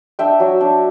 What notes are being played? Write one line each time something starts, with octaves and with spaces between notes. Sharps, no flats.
D4 E5 G5
F#3
D4